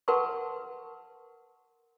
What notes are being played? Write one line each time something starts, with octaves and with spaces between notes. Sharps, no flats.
A#4 B4 F#5 A5 C6 C#6